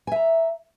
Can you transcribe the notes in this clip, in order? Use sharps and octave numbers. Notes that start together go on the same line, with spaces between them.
E5 G#5 A#5